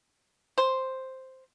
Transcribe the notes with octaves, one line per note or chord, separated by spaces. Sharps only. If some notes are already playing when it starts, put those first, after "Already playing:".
C5